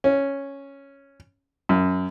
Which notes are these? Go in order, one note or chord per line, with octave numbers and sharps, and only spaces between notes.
C#4
F#2